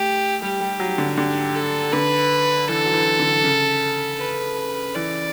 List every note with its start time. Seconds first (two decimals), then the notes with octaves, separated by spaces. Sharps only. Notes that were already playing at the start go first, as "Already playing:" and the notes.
Already playing: A3 G4
0.42 G3 G4
0.61 G3
0.80 F#3
0.98 D3
1.17 D3 G4
1.55 A4
1.92 D3 B4
2.68 E3 A4
2.85 F#3
2.94 E3
3.19 D3
3.44 C#3
4.19 B4
4.95 E3 D5